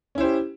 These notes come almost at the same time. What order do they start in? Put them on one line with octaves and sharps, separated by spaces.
C#4 E4 C5 G4